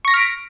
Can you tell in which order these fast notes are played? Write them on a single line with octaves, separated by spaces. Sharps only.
C#6 A#6 B6 F6 D7